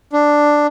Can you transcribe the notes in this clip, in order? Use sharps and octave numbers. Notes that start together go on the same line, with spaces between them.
D4